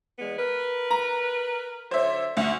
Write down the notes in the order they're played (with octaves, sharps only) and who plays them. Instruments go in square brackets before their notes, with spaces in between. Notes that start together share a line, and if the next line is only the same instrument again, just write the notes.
[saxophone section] E2 G#3 B3
A#4 B4
[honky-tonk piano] A#5
[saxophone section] D3 F#3 C#5 [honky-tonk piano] C5 E5
[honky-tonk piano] D2 [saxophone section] F#4 F#5